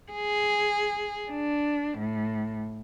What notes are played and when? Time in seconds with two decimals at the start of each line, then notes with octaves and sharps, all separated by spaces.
0.13 G#4
1.31 D4
1.99 A2